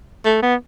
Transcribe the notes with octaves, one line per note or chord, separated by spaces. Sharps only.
A3
B3